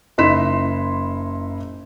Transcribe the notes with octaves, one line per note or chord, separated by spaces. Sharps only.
F#1 D#4 E4 C6 B6 E7